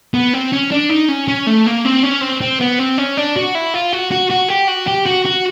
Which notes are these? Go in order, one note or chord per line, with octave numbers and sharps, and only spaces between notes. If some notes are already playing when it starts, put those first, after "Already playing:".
B3
C4
C#4
D4
D#4
C#4
C#4
A3
A#3
C4
C#4
C4
C4
B3
C4
C#4
D4
F#4
E4
F4
F#4
F#4
F#4
G4
F#4
G4
F#4
F#4